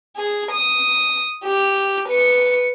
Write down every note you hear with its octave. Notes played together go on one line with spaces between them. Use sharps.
G#4
D#6
G4
B4 C#7